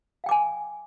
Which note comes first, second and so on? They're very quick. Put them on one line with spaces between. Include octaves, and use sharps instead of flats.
F5 G5 D6 G#5